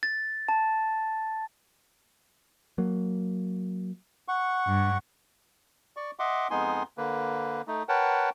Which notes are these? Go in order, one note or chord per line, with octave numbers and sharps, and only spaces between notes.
A6
A5
F#3 A#3
F#5 C#6
G2
D5 C#6
D#5 E5 F#5 C6 D6
F2 G#3 B3 D#4 G#5 C6
D3 A#3 B4
A3 D#4
A#4 B4 C#5 F#5 G5 A5